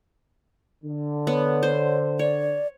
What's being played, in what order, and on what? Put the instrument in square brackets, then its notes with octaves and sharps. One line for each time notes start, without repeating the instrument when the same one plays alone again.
[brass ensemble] D3
[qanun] B3 [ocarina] C#5
[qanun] C5
[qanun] C#5 [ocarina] D5